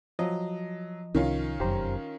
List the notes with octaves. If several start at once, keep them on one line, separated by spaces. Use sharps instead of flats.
F3 F#3 D#5
C2 D#3 C#4 F4
F1 F#2 G4 C5 A#5